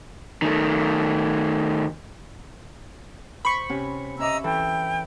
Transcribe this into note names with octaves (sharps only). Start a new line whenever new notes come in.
D#3 A3
C5 B5 C#6
C3 C#4
C#4 D#5 E5 A#5 D6 E6
E3 A4 G5